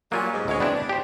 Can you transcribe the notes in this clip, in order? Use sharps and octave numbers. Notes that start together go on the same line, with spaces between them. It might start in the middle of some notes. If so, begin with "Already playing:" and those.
F#3 G3 A#3 F4 G#5
G#2
D2 G#3 C#5
B3 C4 D4 E4
D4
G4 C5